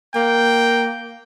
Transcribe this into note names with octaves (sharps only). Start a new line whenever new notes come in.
A#3 G5